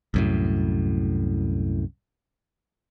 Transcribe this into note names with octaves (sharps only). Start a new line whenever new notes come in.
C2 F#2 A2